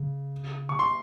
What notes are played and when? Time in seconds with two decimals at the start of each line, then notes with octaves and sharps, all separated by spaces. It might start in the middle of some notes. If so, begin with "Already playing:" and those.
Already playing: C#3
0.69 C#6
0.79 C6